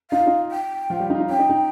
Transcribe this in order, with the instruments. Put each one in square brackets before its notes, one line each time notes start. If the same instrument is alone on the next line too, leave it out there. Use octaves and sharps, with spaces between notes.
[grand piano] D#4 [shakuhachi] F5
[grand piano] F4
D#4
[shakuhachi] G5
[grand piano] F3 F4
G3 G4
D#4
F4
D#4
[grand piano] C#4 [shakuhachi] G5
[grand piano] D#4
D#4